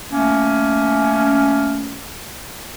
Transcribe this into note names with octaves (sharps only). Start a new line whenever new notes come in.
A3 A#3 C#4